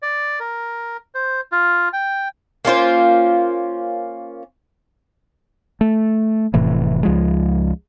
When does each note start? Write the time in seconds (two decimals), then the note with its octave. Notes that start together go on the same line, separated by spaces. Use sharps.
0.02 D5
0.40 A#4
1.15 C5
1.52 F4
1.93 G5
2.65 A#3 C#4 F4 C5
5.81 A3
6.54 F1 A2 C3 E3
7.03 C#2 F3 G#3